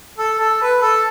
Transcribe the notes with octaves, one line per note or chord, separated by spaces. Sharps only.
A4
A4
B4
A4